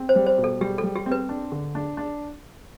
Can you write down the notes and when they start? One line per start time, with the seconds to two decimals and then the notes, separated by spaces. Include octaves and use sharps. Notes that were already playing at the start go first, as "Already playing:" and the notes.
Already playing: C4
0.09 C5
0.16 G3
0.26 C5
0.38 B2
0.44 A4
0.61 G3 G4
0.78 A4
0.83 G3
0.96 G4
1.06 C4
1.12 B4
1.29 D4
1.52 D3
1.75 D4
1.97 D4